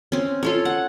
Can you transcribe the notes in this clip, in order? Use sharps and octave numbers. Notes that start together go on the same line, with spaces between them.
C4 C#4
F4 A4 C#5
F#5